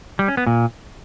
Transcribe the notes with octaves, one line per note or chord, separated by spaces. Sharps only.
G3
C#4
B3
A#2